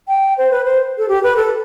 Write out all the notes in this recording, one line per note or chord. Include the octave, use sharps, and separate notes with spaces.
G5
C5
B4
C5
A4
G4
B4
A4